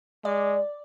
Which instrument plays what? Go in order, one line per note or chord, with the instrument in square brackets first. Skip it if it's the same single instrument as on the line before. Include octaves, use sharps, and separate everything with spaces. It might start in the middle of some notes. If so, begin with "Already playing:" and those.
[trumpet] G#3 [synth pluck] D5